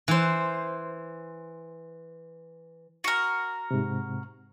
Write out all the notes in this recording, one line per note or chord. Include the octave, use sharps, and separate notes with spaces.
E3 C5
F#4 A#4
G#2 C3